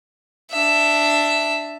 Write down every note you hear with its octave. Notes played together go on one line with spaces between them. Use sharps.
D4 E5